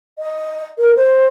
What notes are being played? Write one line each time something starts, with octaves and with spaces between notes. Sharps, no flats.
D#5
A#4
C5